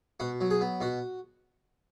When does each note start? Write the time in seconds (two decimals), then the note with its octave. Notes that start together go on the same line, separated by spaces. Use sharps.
0.20 B2 F#4
0.41 F#3
0.51 G#4
0.61 B3
0.81 B2 F#4